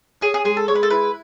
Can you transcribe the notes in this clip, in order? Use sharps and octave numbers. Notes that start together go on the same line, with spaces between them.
C#4 G#4
G#4
G#3 G#4
A4
G#3 C#5
B4
A4
E4 B4